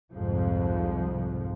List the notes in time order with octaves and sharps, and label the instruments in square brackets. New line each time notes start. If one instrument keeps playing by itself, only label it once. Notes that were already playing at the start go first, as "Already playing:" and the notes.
[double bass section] C2 F2 G#2 F3